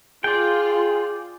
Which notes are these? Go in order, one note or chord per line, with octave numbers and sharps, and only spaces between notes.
F4 G#4 D5 G5